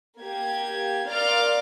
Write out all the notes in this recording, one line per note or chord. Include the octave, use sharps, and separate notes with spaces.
A#3 G4 G#6
A#4 D5 F5 C6 D6 F6